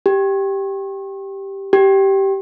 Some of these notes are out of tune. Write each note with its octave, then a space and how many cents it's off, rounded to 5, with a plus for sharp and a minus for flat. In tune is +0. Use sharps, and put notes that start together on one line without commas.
G4 +0
G4 -10